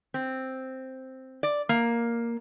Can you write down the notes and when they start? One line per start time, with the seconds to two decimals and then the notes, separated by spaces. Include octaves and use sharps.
0.14 C4
1.43 D5
1.69 A#3